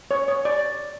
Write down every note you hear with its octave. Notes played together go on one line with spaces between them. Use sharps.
C#5
C#5
D5